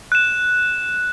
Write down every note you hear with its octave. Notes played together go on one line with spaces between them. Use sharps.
F#6 E7